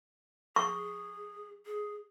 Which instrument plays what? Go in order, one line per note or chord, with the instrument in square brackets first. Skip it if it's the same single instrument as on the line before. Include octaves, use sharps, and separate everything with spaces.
[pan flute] G#4 [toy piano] C#6
[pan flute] G#4